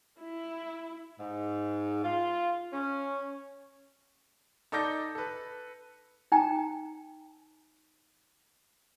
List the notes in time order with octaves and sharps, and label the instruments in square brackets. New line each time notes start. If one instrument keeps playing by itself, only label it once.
[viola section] E4
[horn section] G#2
F4
C#4
[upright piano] D#4 A4 D5 D6 G6 A#6
A4 B4
[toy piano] D#4 G5 G#5 A#5